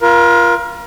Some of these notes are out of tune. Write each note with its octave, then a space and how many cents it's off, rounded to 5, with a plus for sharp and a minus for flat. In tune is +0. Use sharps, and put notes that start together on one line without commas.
F4 -15 A#4 +35